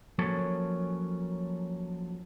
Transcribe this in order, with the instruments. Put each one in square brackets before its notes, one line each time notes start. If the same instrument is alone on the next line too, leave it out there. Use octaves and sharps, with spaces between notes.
[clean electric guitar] F3 F#3 A#3 C#4 A4 C#5